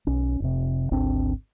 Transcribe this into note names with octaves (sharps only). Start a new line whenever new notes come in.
B1 C#4
F1 C3
G#1 D2 C4 D4